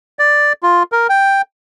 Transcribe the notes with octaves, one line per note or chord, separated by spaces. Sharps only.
D5
F4
A#4
G5